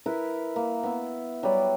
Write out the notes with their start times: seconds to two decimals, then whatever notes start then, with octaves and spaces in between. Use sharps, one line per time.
0.06 E4 A#4 B4
0.56 A#3
0.83 B3 E4
1.43 F#3 G3 D5 B5